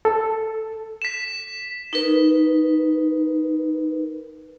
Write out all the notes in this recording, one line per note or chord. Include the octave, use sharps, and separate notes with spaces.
A4
B6 E7
D#4 A#4 B4